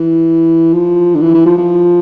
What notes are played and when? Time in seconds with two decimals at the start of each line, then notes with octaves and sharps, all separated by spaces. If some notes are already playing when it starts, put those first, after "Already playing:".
Already playing: E3
0.73 F3
1.15 D3
1.21 E3
1.34 E3
1.46 F3
1.58 F3